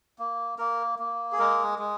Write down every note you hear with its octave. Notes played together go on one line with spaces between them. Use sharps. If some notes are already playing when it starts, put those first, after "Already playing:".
A#3
A#3 A#4
A#3
G#4
G#3 A#4
G#3